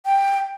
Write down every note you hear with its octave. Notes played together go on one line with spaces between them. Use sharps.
G5